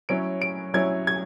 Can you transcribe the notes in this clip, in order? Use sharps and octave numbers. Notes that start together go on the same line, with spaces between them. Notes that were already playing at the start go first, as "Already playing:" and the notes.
F#3 C#4 E4 D7
D7
F#3 C#4 E4 G#6
G#6